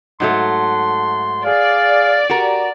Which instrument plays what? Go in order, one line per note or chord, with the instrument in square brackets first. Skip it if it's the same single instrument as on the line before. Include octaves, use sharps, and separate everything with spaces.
[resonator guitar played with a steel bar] G#2 F#3 A3 [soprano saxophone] C6
[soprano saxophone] G#4 [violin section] D5 [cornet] F5
[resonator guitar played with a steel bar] F#4 A#4 [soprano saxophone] G4